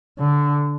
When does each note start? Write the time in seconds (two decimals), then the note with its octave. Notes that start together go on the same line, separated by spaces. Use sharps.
0.19 D3